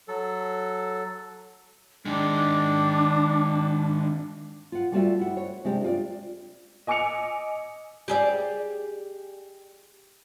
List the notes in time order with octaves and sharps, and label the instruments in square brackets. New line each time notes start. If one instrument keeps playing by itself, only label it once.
[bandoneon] F#3 A4
[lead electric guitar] D#3 G#3 [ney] D4
[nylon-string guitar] F4 F#5
G3 A3 F4 F#4 D5 E5
E4 F#5
C#5
C3 G#3 C4 D4 G4
F4 D5
[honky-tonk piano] D#5 G#5 D6 E6 C#7 F7
[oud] G4 G#4 D5